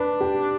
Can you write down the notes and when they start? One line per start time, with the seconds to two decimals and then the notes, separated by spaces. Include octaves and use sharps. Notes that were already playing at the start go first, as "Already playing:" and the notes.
Already playing: D4 B4
0.21 G4